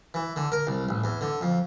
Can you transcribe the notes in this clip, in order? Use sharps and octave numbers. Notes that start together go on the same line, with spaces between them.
E3
D3
A#4
C2
A1
E2
D3
F2